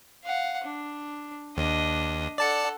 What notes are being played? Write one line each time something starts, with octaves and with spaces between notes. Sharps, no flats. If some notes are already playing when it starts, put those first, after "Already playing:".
F5 F#5
D4
D#2 D4 D#5
A4 D5 F#5 A5 C#7